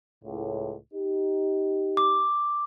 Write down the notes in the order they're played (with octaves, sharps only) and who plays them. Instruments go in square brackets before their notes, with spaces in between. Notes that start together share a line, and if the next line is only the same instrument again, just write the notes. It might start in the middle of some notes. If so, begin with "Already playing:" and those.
[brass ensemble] C#2 A2
D#4 G4
[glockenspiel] D6